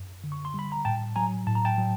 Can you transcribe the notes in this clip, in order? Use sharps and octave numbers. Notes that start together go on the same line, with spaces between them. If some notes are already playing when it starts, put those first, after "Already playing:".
Already playing: F#2
D3
C#6
C6
G3 B5
A#5
A2 G5 A5
F#3 G#5 A#5
A2 A5
A#5
G5 A5
F#3